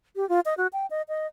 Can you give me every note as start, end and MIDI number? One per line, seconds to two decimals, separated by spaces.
0.16 0.28 67
0.29 0.40 65
0.46 0.54 75
0.58 0.67 66
0.73 0.86 79
0.90 1.02 75
1.09 1.27 75